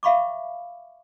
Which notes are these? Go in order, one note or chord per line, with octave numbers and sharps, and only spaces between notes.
E5 F5 B5 C#6 D6